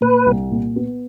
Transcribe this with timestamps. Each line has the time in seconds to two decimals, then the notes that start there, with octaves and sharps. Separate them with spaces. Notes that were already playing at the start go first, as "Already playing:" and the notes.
0.01 A#2 B4
0.26 C2
0.51 A#2
0.76 B3